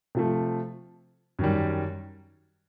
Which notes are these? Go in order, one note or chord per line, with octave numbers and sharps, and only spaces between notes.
C3 F3 A3
F#2 D#3 G3